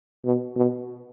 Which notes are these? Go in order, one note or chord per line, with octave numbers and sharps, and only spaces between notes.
B2
B2